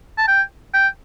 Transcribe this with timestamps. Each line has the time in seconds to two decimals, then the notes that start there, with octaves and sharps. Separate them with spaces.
0.18 A5
0.28 G5
0.74 G5